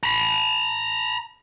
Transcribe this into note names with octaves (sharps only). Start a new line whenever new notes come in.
A#5 B5